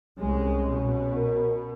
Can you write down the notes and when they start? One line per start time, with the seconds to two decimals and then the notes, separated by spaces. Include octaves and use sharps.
0.19 C2 G#3 C#4
0.70 B2
1.16 A#4